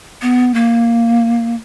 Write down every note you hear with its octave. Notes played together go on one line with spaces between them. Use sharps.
B3
A#3